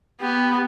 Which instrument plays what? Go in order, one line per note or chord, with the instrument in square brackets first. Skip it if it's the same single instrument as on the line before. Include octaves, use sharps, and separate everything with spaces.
[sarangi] B3 [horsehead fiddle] G4